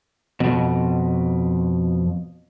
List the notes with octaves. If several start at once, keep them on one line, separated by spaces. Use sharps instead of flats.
F2 B2